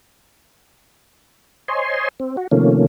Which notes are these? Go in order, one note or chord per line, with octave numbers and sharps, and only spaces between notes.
C5 C#5 D#5 G#5 C6
C4
F#4
C3 D#3 F3 A3 A#3 C#4